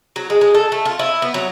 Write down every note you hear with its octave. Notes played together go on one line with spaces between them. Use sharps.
F#3
G#3
G#3
A4
A3
F4
E4
B3
F#3